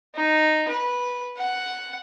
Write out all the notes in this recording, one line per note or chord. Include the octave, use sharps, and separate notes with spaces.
D#4
B4
F#5